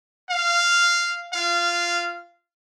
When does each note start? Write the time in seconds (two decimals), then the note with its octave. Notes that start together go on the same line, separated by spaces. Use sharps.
0.30 F5
1.34 F4 F5